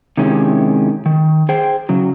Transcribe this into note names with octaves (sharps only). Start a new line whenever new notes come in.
C3 D#3 G#3 C#4 E4 G4
D#3
G#4 C5 G5
C#3 F#3